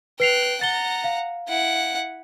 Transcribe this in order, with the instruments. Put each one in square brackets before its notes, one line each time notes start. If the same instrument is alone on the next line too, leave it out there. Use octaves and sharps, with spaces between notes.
[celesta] B4 C7 F7 [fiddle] G5 F#6
[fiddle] F#5 A#5 [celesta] A6 G7
[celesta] F5
[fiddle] E4 F#5